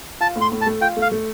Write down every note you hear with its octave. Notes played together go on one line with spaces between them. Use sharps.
F4 A5
A2
C6
A2
A5
A3
F4 G5
A3
F5
A3